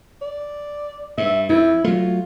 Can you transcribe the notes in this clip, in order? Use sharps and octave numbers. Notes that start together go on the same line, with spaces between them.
D5
G2 E5
F2 E4
F#3 A3 F4